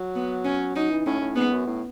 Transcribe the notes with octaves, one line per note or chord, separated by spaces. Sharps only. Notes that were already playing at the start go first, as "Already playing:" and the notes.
Already playing: F#3
B3
C#4
F#3 D#4
E3
A2 C#4
A2
G#2 B3
F#2
A2